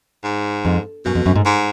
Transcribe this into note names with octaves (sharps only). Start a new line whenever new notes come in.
G#2
F2
F#2 B2
F2
F#2
G#2
G#2